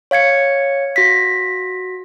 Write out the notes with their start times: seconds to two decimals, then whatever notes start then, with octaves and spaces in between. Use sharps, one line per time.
0.11 C#5 F5 G#6 C#7
0.96 F#4 A#6 B6